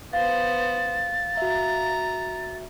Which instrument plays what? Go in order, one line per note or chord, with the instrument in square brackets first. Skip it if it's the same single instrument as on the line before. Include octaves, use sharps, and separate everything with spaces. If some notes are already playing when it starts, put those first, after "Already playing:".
[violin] B3 C5 [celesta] F5 [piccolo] A6
[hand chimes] F#4 E5 [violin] A#5